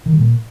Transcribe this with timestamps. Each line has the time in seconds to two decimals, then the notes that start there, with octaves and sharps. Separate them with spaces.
0.06 D#3
0.13 G3
0.19 A#2